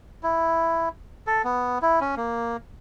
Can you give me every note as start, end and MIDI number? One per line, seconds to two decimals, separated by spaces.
0.23 0.89 64
1.27 1.42 69
1.45 1.78 59
1.82 1.99 64
2.01 2.15 61
2.17 2.57 58